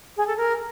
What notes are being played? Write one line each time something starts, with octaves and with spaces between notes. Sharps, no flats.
G#4
A4
A#4